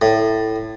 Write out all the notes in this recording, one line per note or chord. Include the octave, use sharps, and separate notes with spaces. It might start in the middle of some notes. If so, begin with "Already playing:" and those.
A2